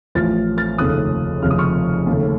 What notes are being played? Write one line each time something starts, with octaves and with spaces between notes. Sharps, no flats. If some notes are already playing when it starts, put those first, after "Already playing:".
A1 A2 F3 F6 A6
F6 A6
F1 D#2 C#3 A3 D#6 F#6
F1 D#2 C#3 F6
D#6
C#6 F6
D#2 C#3 A3